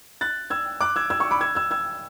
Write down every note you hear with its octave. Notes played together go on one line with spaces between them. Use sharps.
F#6 A6
E6 G#6
D6 F#6
E6 G#6
E6 G#6
C#6 E6
B5 D6
E6 G#6
E6 G#6
E6 G#6